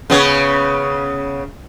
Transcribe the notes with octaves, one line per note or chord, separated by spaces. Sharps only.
C#3 B3 C#5